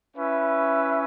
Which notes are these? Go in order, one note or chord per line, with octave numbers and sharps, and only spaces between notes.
C#4 E4 B4 E5